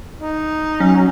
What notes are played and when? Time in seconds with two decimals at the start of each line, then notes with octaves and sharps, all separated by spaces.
0.19 D#4
0.80 F#3 C#4